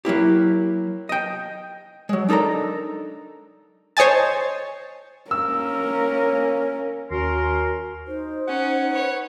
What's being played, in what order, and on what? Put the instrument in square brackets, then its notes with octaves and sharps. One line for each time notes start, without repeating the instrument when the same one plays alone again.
[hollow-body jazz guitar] F#3 A#3 E4 G4
D#5 G5
F#3 G#3
D4 D#4 A4 A#4 A#5
[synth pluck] C5 C#5 D#5 G#5 A5
[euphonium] A#3 [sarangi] C#4 [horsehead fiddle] A#4 [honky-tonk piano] E6
[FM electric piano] D#2 [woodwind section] C#4 A#4 C6 [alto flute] F#4
[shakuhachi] D#4 [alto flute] C5
[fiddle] C#4 [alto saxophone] F#5
[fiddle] B4 C#5